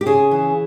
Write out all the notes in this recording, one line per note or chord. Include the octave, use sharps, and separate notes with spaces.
G4
C#3 G#4
E3